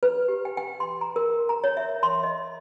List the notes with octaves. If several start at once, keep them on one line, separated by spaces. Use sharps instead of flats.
B4
G4
G5
G5
C6
A#5
A#4
A#5
C#5
E5
C6
D#5